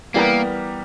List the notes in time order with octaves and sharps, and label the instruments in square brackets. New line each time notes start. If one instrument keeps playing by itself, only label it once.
[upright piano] E3 G3 B3 G4 A#4 [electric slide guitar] A#3